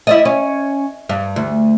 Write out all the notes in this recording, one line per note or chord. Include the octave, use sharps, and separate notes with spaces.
E4 D5 D#5
C#4
G2
D2